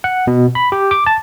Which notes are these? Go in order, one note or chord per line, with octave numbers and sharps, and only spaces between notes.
F#5
B2
B5
G4
D6
A5